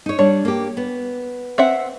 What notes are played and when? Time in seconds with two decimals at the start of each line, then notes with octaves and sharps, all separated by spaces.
0.06 D#4 C#5
0.19 G3 D4 C#5
0.45 A#3 G4
0.77 B3
1.58 C4 E5 F#5